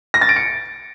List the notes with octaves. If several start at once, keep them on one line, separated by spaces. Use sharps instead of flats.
A#6
A6
D7
C#7